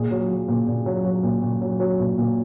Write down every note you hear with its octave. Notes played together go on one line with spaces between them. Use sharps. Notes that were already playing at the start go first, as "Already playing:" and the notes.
Already playing: A#2 G#4
F#3
F#3
A#2
A#2
F#3
F#3
A#2
A#2
F#3
F#3
A#2
A#2